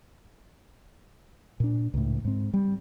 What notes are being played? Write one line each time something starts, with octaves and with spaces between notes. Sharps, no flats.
A#2 D4
C#2 A2
G#2 C4
G3